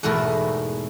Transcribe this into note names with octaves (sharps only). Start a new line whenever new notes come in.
E2 G#2 B2 A3 E4 A#4